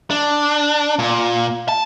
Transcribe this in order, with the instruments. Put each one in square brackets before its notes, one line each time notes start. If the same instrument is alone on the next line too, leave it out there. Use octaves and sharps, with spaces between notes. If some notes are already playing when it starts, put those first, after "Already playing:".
[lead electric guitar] D4
A#2
A5